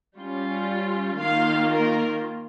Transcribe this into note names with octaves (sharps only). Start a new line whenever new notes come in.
G3 C#4 F4
D#3 A#3 F4 F5
A#4